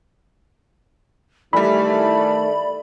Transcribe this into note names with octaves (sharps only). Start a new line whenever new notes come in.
D#3 E3 G3 A3 D5 B5